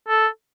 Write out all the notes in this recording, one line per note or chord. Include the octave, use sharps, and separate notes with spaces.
A4